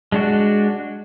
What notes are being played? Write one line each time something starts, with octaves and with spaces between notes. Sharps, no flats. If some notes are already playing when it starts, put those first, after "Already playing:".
G#3 D4 F#4